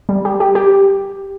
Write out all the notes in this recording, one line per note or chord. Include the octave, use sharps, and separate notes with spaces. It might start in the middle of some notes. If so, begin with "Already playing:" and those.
G3
G4
G4
G4